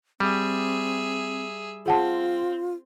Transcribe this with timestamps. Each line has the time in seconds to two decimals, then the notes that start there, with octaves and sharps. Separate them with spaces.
0.20 G3 C4 G#4 E5
1.86 C4 F4 G#4 F#5 A5